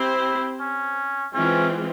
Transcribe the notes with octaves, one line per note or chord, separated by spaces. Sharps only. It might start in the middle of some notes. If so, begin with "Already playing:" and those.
Already playing: C4 E4 G4 C5
C#4
E3 G#3 C4 C#4 F4